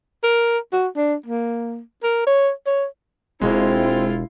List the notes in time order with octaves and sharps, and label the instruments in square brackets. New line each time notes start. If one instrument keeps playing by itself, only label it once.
[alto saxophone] A#4
F#4
D4
A#3
A#4
C#5
C#5
[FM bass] E1 [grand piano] G#3 [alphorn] C4 [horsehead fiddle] E4 F4